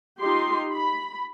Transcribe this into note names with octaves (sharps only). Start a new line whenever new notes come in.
D#4 F4 G4 C6
B5